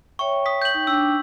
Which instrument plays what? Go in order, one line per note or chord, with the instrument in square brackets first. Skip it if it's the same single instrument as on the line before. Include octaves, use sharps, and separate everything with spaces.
[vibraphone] C#5 E5 G5 [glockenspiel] C#6
[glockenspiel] D#6 B6
G6 F#7
[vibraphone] D#4 G5
[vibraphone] D4 G5 D6 [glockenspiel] E6